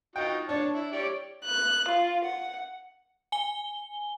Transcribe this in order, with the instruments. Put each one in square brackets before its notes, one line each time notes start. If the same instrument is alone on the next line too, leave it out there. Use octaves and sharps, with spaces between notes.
[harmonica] D#4 F4 F#4 [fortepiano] G5
[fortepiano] D4 [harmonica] C#5 A5
[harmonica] E4
G4 C#5 D5
[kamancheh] F#6
F4
F#5
[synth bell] G#5 G7